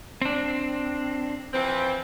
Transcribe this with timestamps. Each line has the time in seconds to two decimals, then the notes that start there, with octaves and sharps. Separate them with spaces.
0.22 C4 D4
1.53 E3 F3 C4